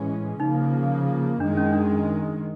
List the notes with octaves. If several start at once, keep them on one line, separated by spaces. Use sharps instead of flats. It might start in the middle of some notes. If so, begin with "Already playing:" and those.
Already playing: A2 E3 G#3 C#4
C#3 F3 A#3 D#4
F#2 D#3 G#3 D4
C#4
D4